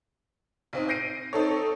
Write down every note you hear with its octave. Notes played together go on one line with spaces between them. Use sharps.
B1 C4 D#4
G6 A#6 C7 D7 D#7
C4 D#4 A4 C#5